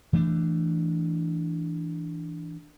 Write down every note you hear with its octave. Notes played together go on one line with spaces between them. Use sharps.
E3 A3 C4 D4